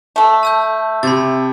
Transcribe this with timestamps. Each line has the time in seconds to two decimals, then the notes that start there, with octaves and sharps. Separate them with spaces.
0.16 A3 A4
0.43 A5 E6 G6
1.03 C3 B5 G#6 A6